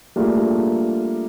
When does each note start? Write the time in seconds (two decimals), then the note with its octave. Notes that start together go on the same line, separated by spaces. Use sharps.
0.16 G3 A3 A#3 D4 F4 G#4